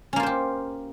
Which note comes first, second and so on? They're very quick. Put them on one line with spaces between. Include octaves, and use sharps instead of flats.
C#4 A#3 F4 C5 G4